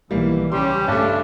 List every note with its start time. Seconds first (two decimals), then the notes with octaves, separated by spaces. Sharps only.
0.11 B1 D#3 E3 G3 A#3
0.52 C#3 G3 C#4 G4 C6
0.88 G2 G3 A3 D4